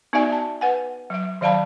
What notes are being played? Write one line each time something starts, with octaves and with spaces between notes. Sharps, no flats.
B3 D#4 F#4 D5 E5 G#5
A5
B4 F#5 G#5
F#3 E5
D#3 F#3 D5 F5 A5 B5